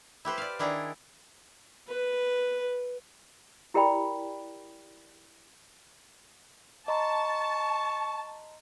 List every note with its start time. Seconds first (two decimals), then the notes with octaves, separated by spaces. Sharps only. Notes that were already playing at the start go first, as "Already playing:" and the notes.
0.25 E4 G4 B4 C5
0.38 D5 F5
0.59 D#3 D4 E4 G#4 D5 A#5
1.88 B4
3.74 E4 G4 A#4 D5 G5 B5
6.88 D#5 A5 A#5 C6 C#6